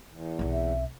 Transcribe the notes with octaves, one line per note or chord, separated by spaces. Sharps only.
E2
B1 C4
E5